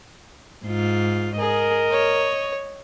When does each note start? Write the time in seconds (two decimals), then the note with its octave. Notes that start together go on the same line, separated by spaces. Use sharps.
0.65 G#2 F4
1.39 G#4 A#4 D#5
1.91 C#5